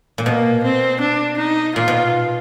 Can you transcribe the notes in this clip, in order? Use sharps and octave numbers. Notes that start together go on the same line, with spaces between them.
A#2
B2 A#3
C4
D4
D#4
A#2 F4
B2